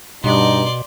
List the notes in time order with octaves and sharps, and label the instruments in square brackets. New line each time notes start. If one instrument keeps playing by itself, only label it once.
[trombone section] G2 [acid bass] B2 [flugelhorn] D#4 [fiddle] D5 C6